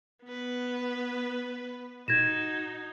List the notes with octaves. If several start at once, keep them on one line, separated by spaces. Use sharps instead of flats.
B3 B4
D#4 F#4 G#6 A#6 E7